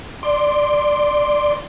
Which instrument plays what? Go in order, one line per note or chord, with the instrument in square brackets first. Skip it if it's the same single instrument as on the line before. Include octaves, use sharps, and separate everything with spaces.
[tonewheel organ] D5 C6